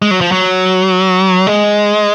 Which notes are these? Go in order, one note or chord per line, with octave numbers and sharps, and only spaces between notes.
G#3
F#3
F3
F#3
G#3